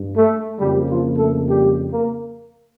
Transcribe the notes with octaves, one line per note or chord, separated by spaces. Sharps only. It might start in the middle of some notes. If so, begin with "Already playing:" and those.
Already playing: G2
A3 A4
F2 C#3 F3 G3 A#3 G4
F3 F4
A3 A4
G3 G4
A#3 A#4